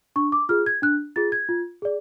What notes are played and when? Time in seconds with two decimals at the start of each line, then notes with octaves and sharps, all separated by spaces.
0.16 D4 C#6
0.32 D6
0.49 F4 G#4 F6
0.66 G#6
0.82 D4 F#6
1.16 F4 G#4 A6
1.32 G#6
1.49 F4
1.82 G#4 D5